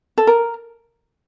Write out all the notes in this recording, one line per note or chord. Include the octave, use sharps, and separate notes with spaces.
A4
A#4